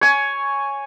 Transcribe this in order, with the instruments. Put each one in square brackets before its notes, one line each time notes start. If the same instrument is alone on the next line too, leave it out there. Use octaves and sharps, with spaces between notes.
[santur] C#5 G#5